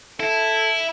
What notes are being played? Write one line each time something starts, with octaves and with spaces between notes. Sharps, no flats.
E4 A4